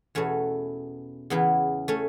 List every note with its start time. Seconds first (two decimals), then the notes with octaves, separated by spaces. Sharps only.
0.15 E2 B2 A3 C#4
1.30 E2 C#3 E3 B3
1.88 A3 C#4